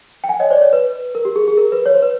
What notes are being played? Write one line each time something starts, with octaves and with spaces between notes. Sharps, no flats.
G5
F#5 G#5
C#5 D#5
C5 D5
C#5
B4
A#4
G4
G#4
G#4
A#4
B4
C#5
C5
B4